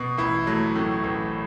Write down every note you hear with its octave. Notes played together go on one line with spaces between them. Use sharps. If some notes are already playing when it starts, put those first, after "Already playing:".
Already playing: B2
A1 E4
F#3 A3
A2 A3
A1